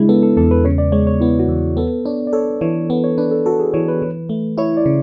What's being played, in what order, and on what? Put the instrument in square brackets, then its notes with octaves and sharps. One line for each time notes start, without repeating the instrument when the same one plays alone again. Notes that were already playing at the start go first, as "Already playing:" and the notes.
Already playing: [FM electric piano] C#3 G#3 [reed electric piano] D4 E4
[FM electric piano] B3 [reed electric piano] A4
[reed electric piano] A4
[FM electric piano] E2 [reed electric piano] A4
[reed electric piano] B4
[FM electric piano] C#3 [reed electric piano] C#5
[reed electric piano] D5
[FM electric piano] G#3 [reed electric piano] C#5
[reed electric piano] C#5
[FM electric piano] B3 [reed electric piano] E4
[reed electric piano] F#4
[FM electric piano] E2
[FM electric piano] B3 [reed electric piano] A4
[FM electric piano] D4 [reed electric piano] C#5
[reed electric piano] D5
[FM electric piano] A4 [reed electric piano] C#5
[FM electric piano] E3 [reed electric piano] C#5
[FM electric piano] B3
[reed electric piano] C#5
[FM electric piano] D4 [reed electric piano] B4
[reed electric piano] A4
[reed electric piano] F#4 [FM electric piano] A4
[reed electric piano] G#4
[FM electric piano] E3 [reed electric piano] C#5
[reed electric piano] B4
[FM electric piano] E3
A3
[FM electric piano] E4 [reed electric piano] C#5
[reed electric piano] D5
[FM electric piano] C#3